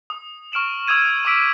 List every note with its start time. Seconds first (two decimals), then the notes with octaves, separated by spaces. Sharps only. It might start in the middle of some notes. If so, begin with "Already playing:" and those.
0.10 D#6
0.52 C#6 F6 D7 E7 F#7
0.87 C#6 D#6 E6 G#6 D#7
1.25 C#6 D6 E6 B6 D7 D#7